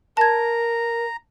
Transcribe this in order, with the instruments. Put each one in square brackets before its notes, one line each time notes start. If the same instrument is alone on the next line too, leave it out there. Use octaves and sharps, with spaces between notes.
[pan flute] A#4 [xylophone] A5 G#6 [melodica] A#5